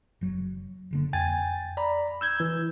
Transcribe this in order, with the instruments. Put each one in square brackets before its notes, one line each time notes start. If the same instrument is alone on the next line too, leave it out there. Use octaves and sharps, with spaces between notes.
[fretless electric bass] F#1 F#3
F#1 D3 A#3
[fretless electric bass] F2 [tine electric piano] G5 G#5 A6
[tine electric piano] D5 A#5 B5
E6 G6 G#6
E3